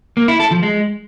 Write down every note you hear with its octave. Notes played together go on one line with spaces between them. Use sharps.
A#3
E4
A4
F3
G#3